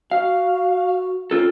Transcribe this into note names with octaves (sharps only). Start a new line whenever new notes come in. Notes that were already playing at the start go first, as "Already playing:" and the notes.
F#4 F5
C#4 F4 A4